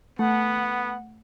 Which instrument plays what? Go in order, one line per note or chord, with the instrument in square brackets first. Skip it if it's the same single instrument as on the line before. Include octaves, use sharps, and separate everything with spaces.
[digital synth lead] A3 [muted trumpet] B3 [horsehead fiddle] F#5